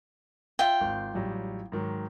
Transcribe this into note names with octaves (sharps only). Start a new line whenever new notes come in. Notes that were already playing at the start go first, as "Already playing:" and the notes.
F4 E5 G5
G#1
A1 F#3 G3
G#2 D#3 F#3